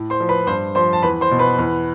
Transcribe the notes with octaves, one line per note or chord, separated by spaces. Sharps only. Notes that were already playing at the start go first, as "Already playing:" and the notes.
Already playing: A2
C5 C6
F3
B4 B5
G2 C5 C6
F3 C5 C6
A5
E2 B4 B5
C5 C6
B2
B4 B5
E2